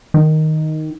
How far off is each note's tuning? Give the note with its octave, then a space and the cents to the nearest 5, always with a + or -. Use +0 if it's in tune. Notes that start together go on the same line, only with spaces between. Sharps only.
D#3 +0